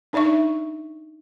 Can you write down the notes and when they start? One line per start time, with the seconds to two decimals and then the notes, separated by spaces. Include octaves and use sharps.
0.13 D4 D#4 D5 E5 C#6